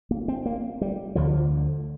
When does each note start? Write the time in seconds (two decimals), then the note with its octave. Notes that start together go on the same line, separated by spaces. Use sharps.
0.11 A#3
0.28 C4
0.46 A#3
0.81 G3
1.15 D2 D3 F3